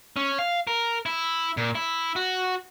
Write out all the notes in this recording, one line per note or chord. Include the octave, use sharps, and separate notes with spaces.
C#4
F5
A#4
E4
A#2
E4
F#4